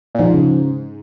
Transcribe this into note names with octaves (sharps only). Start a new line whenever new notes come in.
A#2
G#2 F3
C#3